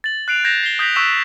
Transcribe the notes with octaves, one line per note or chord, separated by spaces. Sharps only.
A6 F#7
F#6 C7 D7 F7
G6 G#6 A#6 C7 E7 F7
C7 G7
D#6 G6 A#6 B6 F7
C#6 E6 F#6 B6 E7